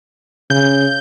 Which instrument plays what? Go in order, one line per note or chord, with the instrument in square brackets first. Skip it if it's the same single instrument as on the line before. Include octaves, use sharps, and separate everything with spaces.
[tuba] C#3 [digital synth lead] G6